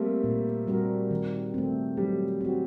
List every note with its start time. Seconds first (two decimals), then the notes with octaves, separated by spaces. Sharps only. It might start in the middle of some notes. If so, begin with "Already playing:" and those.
Already playing: G3 A3 A#3 C4
0.24 A#2
0.67 G3 C4 F#4 A#4
1.11 D#3
1.54 A3 C4
1.97 F#3 G3
2.41 C4 F#4